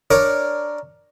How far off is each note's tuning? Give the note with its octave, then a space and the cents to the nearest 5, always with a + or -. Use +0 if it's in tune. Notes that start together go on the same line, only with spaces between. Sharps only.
D4 +5 A#4 +0 C#5 +0